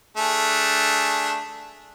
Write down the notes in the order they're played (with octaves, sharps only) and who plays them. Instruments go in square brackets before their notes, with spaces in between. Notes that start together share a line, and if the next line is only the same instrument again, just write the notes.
[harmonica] A3 D4 G#4